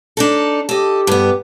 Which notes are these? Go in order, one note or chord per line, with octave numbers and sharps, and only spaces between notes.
D4 D#4 A4
G4 A4 D#5
G2 B3